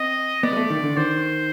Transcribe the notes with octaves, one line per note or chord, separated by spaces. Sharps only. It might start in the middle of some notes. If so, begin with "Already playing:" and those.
Already playing: C4 D#5
B3 D5
G#3
A3
D#3
D3
D#3 C5